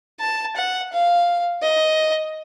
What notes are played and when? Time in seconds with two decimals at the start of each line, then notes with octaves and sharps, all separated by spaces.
0.20 A5
0.56 F#5
0.92 F5
1.62 D#5